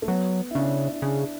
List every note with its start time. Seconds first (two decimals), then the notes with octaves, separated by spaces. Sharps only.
0.02 A3
0.08 F#3 B3
0.51 E4
0.55 C#3 D4
0.92 E4
1.02 C#3 D4